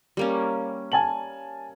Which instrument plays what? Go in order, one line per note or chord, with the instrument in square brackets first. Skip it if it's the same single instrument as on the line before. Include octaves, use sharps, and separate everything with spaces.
[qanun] G3 A#3 C#4
[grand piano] G#5 A5 F#7